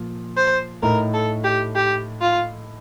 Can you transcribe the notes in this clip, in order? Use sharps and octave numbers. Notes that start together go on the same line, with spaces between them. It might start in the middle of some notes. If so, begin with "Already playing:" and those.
Already playing: A#2 F3
C5
A2 A3 D#4 A#4
A4
G4
G4
F4